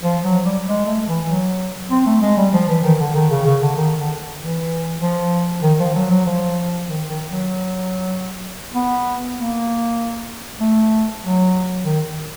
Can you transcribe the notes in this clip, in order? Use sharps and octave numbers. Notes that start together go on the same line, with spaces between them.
F3
F#3
G3
G#3
A3
E3
F#3
C4
A3
G#3
G3
F3
E3
D#3
D3
D#3
C#3
C#3
D3
D#3
D3
E3
F3
D#3
F3
F#3
F#3
F3
D#3
D#3
F#3
B3
A#3
A3
F#3
D#3